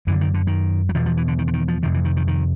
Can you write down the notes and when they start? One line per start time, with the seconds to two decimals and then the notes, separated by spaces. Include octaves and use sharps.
0.07 F#2 D3 E3
0.21 D#3
0.34 D3
0.47 D#3
0.89 F#3
0.95 E2 B2 F3
1.06 F3
1.17 E3
1.28 D3
1.39 D#3
1.47 D3
1.53 D#3
1.68 F3
1.83 F2 C3 D#3
1.94 E3
2.05 D#3
2.17 D#3
2.28 D#3